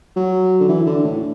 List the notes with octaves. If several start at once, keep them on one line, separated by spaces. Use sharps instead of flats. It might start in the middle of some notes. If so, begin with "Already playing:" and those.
F#3
D3
E3
D3
A2